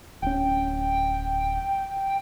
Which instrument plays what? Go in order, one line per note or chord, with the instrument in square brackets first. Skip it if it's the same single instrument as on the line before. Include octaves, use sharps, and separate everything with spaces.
[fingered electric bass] D1 C#4 [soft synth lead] G5